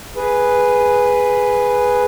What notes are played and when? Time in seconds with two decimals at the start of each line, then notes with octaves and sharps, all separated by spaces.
0.16 G#4 B4